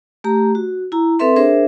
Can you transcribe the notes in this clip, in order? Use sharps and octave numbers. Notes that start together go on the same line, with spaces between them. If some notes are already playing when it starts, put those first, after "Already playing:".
A3 G4 A#5
F#4
E4 A#5
C4 A4 B4 E5 C6
D4 G#4 A#4 C5 E5